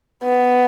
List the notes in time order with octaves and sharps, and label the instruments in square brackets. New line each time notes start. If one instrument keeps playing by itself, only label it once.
[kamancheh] B3